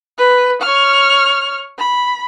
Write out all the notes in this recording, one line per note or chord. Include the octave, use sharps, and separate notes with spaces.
B4
C#5 F6
B5